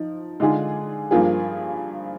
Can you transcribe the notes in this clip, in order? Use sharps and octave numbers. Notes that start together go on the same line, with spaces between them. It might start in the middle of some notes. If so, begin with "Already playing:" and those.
Already playing: F3 D#4
D3 G#3 D4 F4 G#4
G2 F3 A#3 F4 G#4